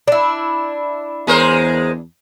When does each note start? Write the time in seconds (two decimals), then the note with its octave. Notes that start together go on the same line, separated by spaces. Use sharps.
0.08 D4 E4
1.27 E2 G#3 A#4 C5